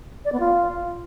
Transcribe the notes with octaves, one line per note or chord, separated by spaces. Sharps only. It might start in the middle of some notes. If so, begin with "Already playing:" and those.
D5
B3
F4